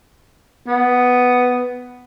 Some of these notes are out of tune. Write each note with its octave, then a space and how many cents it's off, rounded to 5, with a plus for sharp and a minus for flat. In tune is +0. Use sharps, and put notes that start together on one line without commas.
B3 +5